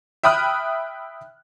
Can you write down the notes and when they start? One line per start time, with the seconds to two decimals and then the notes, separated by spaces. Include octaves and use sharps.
0.24 E5 G5 B5 D#6 F6 F#6